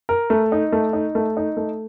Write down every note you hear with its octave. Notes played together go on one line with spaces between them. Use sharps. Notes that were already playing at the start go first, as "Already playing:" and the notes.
A#4
A3
D#4
A3
D#4
A3
D#4
A3